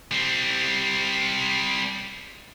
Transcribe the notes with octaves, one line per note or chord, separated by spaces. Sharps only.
G3 C4